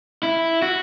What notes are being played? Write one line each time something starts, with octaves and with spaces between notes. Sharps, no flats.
E4
F#4